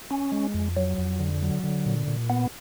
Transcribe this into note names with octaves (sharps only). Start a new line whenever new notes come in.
C#4
G#3
F2
F#3
F2
D3
F#3
D3
A#2
A#2
B3